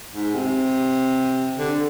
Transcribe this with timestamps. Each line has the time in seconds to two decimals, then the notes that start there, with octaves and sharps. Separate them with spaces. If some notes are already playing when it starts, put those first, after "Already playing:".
0.14 G#2
0.34 C3
1.58 D3